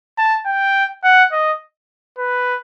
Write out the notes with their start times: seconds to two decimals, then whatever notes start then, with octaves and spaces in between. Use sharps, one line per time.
0.18 A5
0.46 G5
1.04 F#5
1.32 D#5
2.18 B4